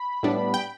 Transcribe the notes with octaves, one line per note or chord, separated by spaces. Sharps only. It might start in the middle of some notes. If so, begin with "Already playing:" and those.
Already playing: B5
A2 G3 B3 D4
G5